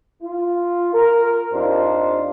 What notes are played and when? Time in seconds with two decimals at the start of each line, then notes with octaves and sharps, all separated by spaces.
0.22 F4
0.93 A#4
1.53 F2 D4 D#4 F4 G4 C5